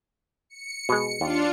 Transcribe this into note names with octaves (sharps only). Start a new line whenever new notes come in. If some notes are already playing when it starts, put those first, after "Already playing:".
C#7
B2 G#3
D#2 D4 F4